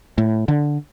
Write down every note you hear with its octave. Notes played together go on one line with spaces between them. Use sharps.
A2
D3